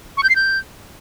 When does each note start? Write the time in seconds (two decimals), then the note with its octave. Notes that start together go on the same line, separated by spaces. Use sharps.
0.17 C#6
0.23 G6
0.29 C7
0.36 G6